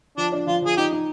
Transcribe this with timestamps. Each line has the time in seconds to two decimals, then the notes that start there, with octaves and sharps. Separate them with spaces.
0.17 F3 D4
0.32 D4
0.47 F3 F4
0.62 F3 G#4
0.77 D#4 G4
0.92 D#4